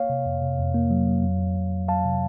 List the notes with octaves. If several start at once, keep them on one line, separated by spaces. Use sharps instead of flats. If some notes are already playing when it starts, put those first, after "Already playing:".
Already playing: A#3 C#5 F5
C3
F2
C3
F2
A#3
F#3
F#3
F2
F2
F2
F2
F#3 F5 A5
C3